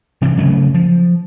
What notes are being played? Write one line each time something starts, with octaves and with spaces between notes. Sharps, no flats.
C3 E3
C#3 F#3 A3
F3